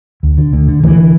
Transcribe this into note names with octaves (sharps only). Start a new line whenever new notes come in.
D2
D3
D2
D3
D2 E3
D3